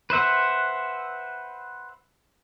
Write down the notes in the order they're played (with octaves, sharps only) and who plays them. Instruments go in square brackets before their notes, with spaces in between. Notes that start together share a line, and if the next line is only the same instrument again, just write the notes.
[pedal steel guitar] B4 C5 E5 F#5